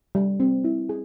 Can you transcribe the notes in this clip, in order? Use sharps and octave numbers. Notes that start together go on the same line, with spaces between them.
G3
C4
E4
G#4